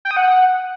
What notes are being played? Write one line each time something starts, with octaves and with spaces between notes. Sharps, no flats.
G5
D#6
F#5